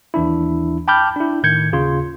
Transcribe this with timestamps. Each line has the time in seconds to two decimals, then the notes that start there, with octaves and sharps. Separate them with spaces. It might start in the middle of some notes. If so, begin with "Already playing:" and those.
0.14 D#2 E3 D4 E4
0.88 G5 A5 B5 D6 F6 G6
1.16 D4 E4
1.43 A2 D#3 G6 G#6 C#7
1.72 D#2 C#3 F4 C6